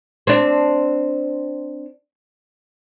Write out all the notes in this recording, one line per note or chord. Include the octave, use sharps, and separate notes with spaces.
C4 D4